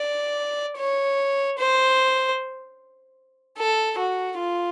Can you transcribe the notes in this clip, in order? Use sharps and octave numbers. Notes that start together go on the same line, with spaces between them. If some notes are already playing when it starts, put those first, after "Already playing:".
Already playing: D5
C#5
C5
A4
F#4
F4